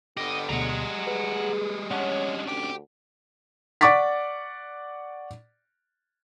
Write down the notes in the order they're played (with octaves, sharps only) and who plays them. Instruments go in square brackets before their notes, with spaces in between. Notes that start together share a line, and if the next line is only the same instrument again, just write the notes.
[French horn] D3 [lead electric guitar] B3 G4 [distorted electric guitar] D#5
[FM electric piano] D2 B2 [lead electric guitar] G3 G#3 [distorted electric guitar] F#5 A#5
[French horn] G#4 [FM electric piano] B4
[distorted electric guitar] C#4 D4 [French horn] C#5 [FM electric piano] F#5 A5
[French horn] D2 [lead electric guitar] G4
[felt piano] D5 F#5 C#6 D6 A6 B6